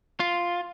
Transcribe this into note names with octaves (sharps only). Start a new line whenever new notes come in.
F4